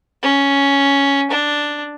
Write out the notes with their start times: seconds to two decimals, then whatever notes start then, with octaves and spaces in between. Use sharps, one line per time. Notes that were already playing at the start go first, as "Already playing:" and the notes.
0.23 C#4
1.31 D4